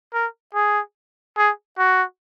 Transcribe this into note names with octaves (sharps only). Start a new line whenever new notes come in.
A#4
G#4
G#4
F#4